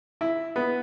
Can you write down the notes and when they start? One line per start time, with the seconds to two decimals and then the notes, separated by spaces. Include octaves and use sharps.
0.21 E4
0.56 B3